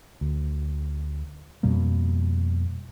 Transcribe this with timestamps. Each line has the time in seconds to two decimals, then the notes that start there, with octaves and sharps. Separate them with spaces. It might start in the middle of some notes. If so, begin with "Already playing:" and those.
0.21 D2
1.63 F2 B2 G3 A#3